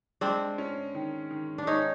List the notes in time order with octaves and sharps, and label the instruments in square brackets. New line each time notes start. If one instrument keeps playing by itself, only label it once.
[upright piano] G#3 [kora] C4 D4
[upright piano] C#4
D#3
D#3
[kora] D4
[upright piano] G#3 [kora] C#4 D#4